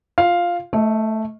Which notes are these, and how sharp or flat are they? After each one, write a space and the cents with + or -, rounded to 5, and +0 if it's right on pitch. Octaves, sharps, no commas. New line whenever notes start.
F4 +0 F5 +0
A3 +0 D#5 +35